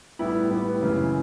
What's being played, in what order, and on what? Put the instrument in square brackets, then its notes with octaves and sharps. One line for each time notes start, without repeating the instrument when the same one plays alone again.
[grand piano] A2 G3 B3 E4 G4
A2 G3 B3 E4 G4
F#2 C#3 E3